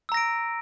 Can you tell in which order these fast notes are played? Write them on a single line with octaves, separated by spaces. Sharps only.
E6 A#5 A#6 D7